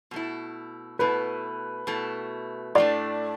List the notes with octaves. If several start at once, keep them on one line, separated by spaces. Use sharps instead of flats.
B2 A3 E4
B2 A3 E4 B4
B2 A3 E4
A2 A3 D4 D5